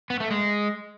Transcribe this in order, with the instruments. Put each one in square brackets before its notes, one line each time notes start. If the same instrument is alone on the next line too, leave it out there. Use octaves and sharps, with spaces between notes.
[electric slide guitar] B3
A3
G#3